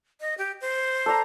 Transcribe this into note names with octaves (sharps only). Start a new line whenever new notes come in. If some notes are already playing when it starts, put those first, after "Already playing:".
D#5
G4
C5
A4 D5 A#5